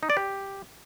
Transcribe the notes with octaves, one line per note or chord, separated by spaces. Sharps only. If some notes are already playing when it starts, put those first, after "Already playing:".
D#4
D5
G4